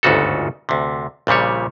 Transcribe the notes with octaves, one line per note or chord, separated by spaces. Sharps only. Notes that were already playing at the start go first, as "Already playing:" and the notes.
G1 D2 G#2 C#3 F#4 A4
D2 C3
A#1 A#2 C#3 G3 C#5